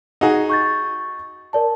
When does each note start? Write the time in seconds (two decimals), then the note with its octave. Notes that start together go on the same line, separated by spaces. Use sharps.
0.21 D#4 F#4 G#4
0.49 C#6 G6 A6
1.53 A#4 D5 A5